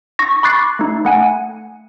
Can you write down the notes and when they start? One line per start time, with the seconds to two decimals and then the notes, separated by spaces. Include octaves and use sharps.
0.19 C#6 A#6
0.43 B5 C#6 D6 F#6 A6 C7
0.79 A3 D#4
1.05 A3 F#5 G#5